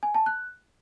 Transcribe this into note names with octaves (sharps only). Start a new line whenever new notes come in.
G#5
A5
F#6